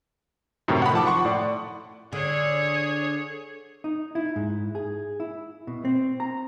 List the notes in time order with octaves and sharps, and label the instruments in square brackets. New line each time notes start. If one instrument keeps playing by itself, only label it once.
[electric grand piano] F#2 A2 C3 D#3
F#5 B5
F3 A5 D6
F#5 C6 C#6
A2 D5
[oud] D3 [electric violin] G#4 C#5
[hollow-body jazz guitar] D#4
E4
G#2
G#4
E4
B2
C4
A#5